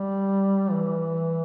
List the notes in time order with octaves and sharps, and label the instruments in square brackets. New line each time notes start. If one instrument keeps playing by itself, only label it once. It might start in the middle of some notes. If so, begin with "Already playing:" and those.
Already playing: [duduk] G3
E3